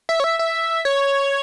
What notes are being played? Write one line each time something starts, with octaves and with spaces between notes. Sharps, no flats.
E5
C#5
E5
E5
C#5